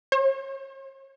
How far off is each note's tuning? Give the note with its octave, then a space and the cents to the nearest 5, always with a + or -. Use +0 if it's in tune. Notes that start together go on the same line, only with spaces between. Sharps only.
C#5 -45